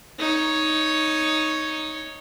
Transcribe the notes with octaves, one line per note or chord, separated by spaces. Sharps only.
D#4 C#5